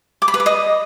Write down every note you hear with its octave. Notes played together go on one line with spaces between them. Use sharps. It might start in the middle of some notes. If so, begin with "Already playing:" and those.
D6
B5
B4
D6
D#5